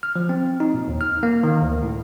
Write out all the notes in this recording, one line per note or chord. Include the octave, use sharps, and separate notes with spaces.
F6
F3
C4
D#4
A#2
D#2
F6
A#3
D#3
D2
A2